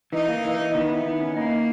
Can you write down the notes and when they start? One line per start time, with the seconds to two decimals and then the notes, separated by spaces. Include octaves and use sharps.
0.13 E3 D#4
0.28 A#3
0.44 E3
0.60 E3
0.74 D#3 B3
0.90 E4
1.05 D#3
1.21 C#4
1.36 A#3 D#4